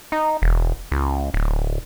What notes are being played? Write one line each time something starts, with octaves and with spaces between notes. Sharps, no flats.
D#4
E1
C#2
D1